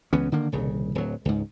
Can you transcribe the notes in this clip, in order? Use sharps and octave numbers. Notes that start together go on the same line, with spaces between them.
C#2 E3 B3 C#4
D3 D#3 A#3
D#1 C2 C#3
D1 F#3
C#2 G#2